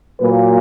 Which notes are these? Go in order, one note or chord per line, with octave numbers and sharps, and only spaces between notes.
A#2 F#3 A#3 B4